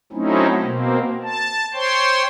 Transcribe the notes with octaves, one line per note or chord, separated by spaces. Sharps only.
F#3 A3 C4 C#4 D#4 E4
B2 A#3 C4
A5
C5 C#5 G5 C6